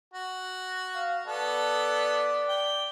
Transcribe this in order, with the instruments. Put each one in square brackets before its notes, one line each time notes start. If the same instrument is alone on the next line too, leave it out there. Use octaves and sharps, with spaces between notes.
[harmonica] F#4
[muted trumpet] F5
[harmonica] B3 A4 [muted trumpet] D5
[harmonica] G5